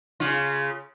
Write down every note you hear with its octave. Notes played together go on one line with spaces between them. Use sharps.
C#3 F4